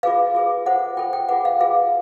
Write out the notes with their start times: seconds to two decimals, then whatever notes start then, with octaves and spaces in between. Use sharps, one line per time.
0.03 F4 G#4 B4 F5
0.35 F4 G#4 B4
0.66 F4 A4 C5 F#5
0.97 F4 A4 C5 G5
1.13 G5
1.29 F4 G#4 B4 F#5
1.45 F5
1.60 F4 G#4 B4 F5